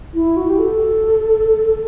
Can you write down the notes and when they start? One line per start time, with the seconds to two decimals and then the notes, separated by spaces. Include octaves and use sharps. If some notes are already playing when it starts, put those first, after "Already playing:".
0.14 E4
0.37 F#4
0.49 G4
0.59 A4